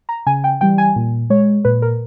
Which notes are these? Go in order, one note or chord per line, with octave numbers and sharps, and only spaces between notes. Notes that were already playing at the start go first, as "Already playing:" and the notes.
A#5
C#3 G#5
G5
E3 G3 G5
G#5
A#2
G#3 C#5
A#2 B4
A#4